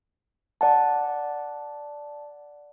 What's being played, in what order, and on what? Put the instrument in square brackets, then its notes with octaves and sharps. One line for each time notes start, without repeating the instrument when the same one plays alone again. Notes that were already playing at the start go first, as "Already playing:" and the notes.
[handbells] D5 F#5 A5